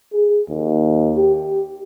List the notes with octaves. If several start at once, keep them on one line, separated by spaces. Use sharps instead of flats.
G#4
D#2
G4